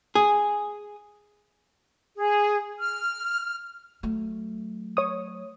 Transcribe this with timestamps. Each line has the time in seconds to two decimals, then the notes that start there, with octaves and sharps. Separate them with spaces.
0.15 G#4
2.16 G#4
2.79 F6
4.03 F#3 A3
4.97 C#5 D#6